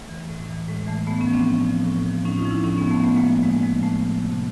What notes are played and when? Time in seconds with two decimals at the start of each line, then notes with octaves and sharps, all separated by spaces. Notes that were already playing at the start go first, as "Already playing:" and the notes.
Already playing: A3
0.09 E3
0.29 A2
0.49 E3
0.68 A2 G#3
0.87 E3 A3
1.07 A2 A3 B3
1.21 B3 C#4
1.27 F3
1.33 C4 D4
1.47 A2
1.66 F3
1.86 A2
2.06 F3
2.25 A2 C#4 D#4
2.38 D#4 F4
2.45 F3
2.51 D4 E4
2.64 A2 C#4 D#4
2.77 B3 C#4
2.84 F3
2.91 A3 B3
3.04 A2 A3 B3
3.16 G#3 A#3
3.24 F3
3.43 A2 G#3
3.62 F3 G#3
3.83 A2 A3
4.02 F3
4.21 C3